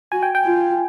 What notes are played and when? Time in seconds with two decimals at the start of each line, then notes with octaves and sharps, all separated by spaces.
0.12 F#4 G#5
0.23 G5
0.35 G5
0.45 F4